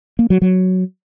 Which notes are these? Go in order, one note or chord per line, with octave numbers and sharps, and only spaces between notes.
A#3
F#3
F#3